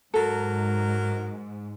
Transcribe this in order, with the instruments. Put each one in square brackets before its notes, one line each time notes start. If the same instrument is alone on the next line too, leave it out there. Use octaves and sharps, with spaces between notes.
[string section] G#2 [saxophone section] F#3 A#4 [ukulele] A4